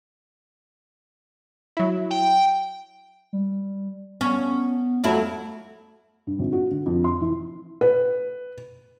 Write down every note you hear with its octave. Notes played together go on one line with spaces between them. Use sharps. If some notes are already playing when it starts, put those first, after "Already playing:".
F#3 E4
G5
G3
B3 C#4
F2 F#3 A3 E4
G2
G#1
F#4
D3
F2
C6
E3
B4